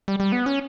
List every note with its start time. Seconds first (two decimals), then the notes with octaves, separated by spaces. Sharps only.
0.08 G3
0.20 G3
0.32 B3
0.46 C#4